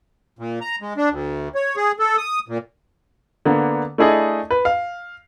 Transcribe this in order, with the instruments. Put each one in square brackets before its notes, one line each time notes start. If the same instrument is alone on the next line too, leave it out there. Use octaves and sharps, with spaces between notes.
[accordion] A#2
A#5
G#3
D4
D2
C#5
G#4
A4
D#6
A#2
[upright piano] D3 A#3 B3
A3 D4 E4 G#4 A4 D#5
B4
F5